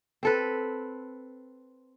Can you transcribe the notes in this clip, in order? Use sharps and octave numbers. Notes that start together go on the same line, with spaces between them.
C4 A4 B4